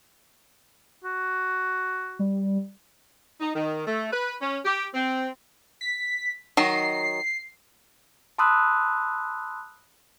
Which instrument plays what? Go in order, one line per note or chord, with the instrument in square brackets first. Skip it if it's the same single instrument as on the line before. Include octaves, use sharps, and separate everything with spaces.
[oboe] F#4
[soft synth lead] G3
[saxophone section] D#4
D#3
A3
B4
C#4
G4
C4
[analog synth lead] B6
[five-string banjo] D#3 F#3 D#4 [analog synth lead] C7
[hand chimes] A5 B5 C6 D#6 E6 F#6